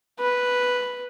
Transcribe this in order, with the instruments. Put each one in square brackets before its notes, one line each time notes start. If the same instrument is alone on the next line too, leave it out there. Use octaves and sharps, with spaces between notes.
[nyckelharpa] B4